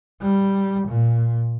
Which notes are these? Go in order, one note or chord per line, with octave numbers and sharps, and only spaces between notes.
G3
A#2